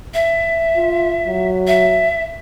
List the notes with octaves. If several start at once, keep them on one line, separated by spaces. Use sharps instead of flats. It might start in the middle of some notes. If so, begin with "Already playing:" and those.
E5
F4
F#3
E5